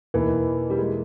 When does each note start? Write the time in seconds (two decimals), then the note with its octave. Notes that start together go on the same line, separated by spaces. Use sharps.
0.14 E2 B2 E3 A#3 D#4
0.70 G3
0.79 G#3